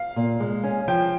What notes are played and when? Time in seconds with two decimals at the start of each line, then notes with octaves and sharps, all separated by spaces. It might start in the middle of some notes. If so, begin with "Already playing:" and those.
Already playing: F5
0.16 A#2
0.40 G#3
0.64 C#4
0.88 F3 G5